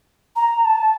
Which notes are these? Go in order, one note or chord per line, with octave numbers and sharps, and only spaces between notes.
A#5
A5